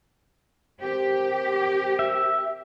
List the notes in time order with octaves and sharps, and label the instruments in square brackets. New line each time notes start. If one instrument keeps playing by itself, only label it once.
[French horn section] C4 A#4 C5 [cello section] G4
[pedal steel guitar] E5